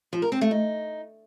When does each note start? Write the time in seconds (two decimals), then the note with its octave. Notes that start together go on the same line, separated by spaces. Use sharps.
0.13 F3
0.22 A#4
0.32 C4
0.41 A3
0.51 D#4